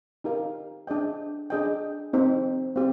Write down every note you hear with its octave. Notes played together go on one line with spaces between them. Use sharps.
D#4 G4 A#4 F5
D4 G#4 D#5 G5
D4 G#4 D#5 G5
C4 D#4 G4
C4 G4